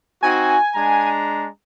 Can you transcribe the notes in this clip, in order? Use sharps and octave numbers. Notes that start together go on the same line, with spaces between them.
C4 D#4 F#4 G#5
G#3 D4 A#5